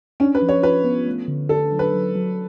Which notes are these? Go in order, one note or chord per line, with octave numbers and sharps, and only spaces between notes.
C#4 D4
B4
F3
C#5
F4 B4
B3
A3
D3
D4 A4
F#3
B4
F#3
F#3